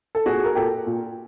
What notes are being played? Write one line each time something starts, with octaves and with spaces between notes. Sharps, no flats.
A4
A#2 F#4 G#4
A#4
A#2 G4 A4
A#2